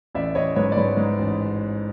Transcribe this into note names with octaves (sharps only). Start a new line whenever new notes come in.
A1 D5 E5
A1 C#5 D#5
G#2 B4 C#5
D5
G#2 B4 C#5
G#2
A1